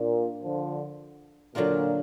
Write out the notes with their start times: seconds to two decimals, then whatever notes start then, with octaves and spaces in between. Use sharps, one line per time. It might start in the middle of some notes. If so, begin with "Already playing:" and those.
Already playing: A#2 D4
0.44 D3 F3
1.55 A#2 D3 F#3 D4 F4 A#4